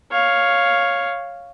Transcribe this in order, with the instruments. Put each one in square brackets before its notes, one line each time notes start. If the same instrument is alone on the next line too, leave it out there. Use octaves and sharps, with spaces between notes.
[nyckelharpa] C#5 F5